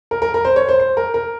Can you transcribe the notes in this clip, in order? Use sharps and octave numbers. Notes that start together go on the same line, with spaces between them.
A#4
A#4
A#4
C5
C#5
C5
C5
A#4
A#4